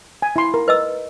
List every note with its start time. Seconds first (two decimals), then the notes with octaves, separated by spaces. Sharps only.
0.22 G#5
0.36 E4 C6
0.54 A#4
0.68 B4 D#5 E6